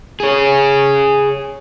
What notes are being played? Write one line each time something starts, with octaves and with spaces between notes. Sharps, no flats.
G#4 C#5